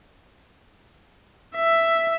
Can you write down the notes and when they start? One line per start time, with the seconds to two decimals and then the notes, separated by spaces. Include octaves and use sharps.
1.56 E5